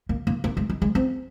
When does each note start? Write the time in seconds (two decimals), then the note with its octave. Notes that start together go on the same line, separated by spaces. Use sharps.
0.09 A#3
0.27 A#3
0.44 A#3
0.57 G#3
0.70 G#3
0.82 G#3
0.95 C4